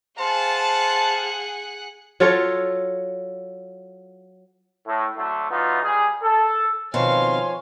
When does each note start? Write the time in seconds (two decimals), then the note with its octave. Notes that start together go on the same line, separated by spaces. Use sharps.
0.19 G#4 C5 F5 F#5 A5
2.20 F#3 F4 A4 C#5
4.87 A2
5.18 D3 F#3 A3
5.51 E3 F#3 B3 D#4 F4
5.84 G3 G#4
6.24 A4
6.94 B2 D#3 F3 C4 C#5 F5 G#5 C6